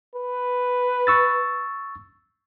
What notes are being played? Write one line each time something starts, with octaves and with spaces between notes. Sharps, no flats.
B4
C#6 E6 A6